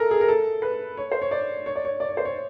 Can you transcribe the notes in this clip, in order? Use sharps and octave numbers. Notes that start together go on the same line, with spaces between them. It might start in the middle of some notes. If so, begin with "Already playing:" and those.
Already playing: A4 A#4
G#4
A#4
A4
B4
C#5
C5
C#5
D5
C#5
D5
C#5
D5
C#5
C5
C#5